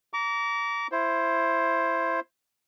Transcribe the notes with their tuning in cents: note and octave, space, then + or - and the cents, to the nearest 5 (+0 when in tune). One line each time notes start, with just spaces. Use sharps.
A#5 +0 D6 -35
E4 +15 C5 +10